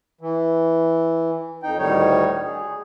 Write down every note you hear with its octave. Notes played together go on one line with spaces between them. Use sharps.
E3
F2 D#4 G5
D2 A2 D#3 G3 D#4 C#5
G#4